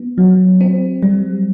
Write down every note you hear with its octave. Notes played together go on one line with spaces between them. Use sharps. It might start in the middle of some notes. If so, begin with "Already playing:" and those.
Already playing: B3
F#3
C4
G3